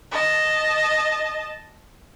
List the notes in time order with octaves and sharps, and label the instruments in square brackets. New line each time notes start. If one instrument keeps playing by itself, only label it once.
[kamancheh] D#5 A5